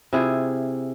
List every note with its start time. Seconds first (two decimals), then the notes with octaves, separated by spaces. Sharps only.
0.13 C3 E4 F4 G#4